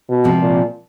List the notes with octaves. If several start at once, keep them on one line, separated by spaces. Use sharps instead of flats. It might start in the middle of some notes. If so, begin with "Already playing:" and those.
B2
C3 F3 G#3 C4
A#2